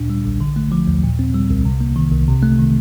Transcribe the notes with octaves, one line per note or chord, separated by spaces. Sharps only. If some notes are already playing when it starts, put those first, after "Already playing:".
Already playing: D2 A#2 D4
G3
A#1
D3
A3
F3
D#2
A#2
C4
G3
C2
C3
A#3
D#3
C2
C3
A3
D#3